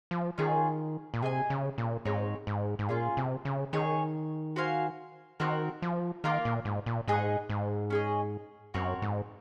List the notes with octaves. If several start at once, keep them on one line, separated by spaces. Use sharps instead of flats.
F3
D#3 C#4 F4 G#4
A#2
C3 G#4 D#5 G#5
C#3
A#2
G#2 C4 D#4 G#4 C#5
G#2
G#2
A#2 C#4 F4 G#4
C3
C#3
D#3 D#4 G#4 C#5
F#4 C5 F5 G#5
D#3 C4 F#4 A#4
F3
D#3 A#3 F4 A#4 F5
A#2
G#2
A#2
G#2 D#4 G#4 D#5 F#5
G#2
C#4 G#4 D#5
F#2 C4 F#4 A#4 C#5
G#2